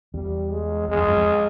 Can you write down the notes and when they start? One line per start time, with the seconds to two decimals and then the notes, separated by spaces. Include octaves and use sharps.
0.14 E2 G3
0.51 G#3
0.88 E2 G#3
0.98 F2
1.07 F#2
1.17 F2